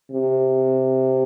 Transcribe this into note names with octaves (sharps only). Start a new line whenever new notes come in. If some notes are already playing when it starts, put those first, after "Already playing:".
C3